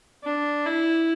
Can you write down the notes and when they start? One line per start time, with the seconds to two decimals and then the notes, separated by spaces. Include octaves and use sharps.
0.24 D4
0.66 E4